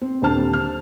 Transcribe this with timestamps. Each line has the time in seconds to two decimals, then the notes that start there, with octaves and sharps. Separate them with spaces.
0.01 C4
0.22 D#1 D3 C4 C5 A5 F6
0.53 F6